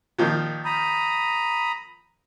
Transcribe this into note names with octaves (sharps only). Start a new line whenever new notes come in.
A#2 D#3 F3
A#5 B5 D#6